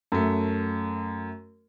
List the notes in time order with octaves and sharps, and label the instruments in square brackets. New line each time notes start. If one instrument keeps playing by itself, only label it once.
[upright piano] F#2 A3